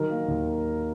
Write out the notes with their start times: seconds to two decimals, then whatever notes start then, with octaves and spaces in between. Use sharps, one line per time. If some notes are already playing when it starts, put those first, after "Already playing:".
Already playing: D#3 F#3 A#4
0.10 A#3
0.28 D#2